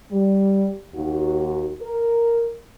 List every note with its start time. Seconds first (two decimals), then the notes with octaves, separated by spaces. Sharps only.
0.12 G3
0.94 D#2 F#4
1.82 A#4